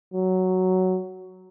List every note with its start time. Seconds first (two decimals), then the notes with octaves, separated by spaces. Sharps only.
0.14 F#3